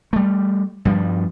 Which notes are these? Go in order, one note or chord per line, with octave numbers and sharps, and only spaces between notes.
G3 A3
G2 F3 G3